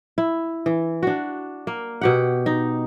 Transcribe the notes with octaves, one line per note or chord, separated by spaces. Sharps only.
E4
E3
D4 F#4
A#3
B2 G4 F#5
D#4